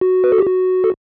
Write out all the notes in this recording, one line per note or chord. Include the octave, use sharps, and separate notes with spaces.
F#4
B4
A4
G4
F#4
A4